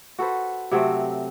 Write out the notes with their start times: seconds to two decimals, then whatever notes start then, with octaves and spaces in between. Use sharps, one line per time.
0.19 F#4 A4 B4 C5
0.71 C3 F#3 A3 C4